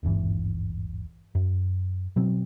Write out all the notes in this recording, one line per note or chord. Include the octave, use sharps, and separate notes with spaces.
D#1 G#1 G2 E3
F#2
B2 F#3 C4